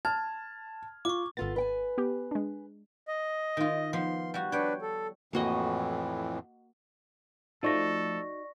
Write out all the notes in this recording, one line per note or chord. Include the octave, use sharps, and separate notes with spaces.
A5 F6 G#6
F4 C#6 D6
G#1 B3 F4 A4 A6
B4 G5 G#5
B3 G4
G#3 D4
D#5
D#3 F4
F3 B3 C6
G3 F#4
D4 B4 C#5 G5
A4
F2 A2 E3 A#3 F#4 D#5
F3 A3 D#4 F#4 A4 D5 C#6 A#6